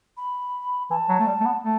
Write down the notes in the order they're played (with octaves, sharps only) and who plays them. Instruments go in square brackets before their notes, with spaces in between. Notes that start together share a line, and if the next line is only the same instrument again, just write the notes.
[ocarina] B5
[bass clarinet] E3 [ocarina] A5
[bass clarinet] F#3
A3
G3
A3
B3
A3